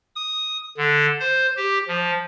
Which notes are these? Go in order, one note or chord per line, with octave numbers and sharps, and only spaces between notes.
D#6
D3
C5
G4
F3